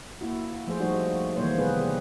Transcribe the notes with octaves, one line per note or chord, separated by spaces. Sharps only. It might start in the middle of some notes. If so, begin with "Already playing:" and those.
A#3 E4 F#4
F3 A3 G#4 C5
G3 D#4 F#4
D#3 E3 G3 A#3 C5 C#5
C3 G3 B3 G#4 B4